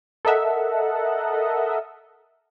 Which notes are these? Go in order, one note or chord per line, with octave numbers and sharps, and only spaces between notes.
A4 A#4 D#5 E5 F#5